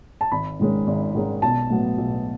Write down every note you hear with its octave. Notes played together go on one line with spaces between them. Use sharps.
A5
G#1 B5
G#2 D#3 G#3 C#4
G#1
G#2 D#3 G#3 C#4
B1 A5
A2 F#3 B3
B1